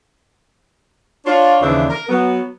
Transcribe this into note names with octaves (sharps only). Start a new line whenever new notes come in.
D4 F4 C#5
D#2 C#3 E3 D4 C5 E5
A#4
F#3 B3